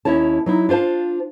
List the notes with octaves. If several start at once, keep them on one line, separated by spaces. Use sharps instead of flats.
D#2 C#4 E4 C#5 A5
F#3 D#4 E4
D4 F4 C5 F5 A5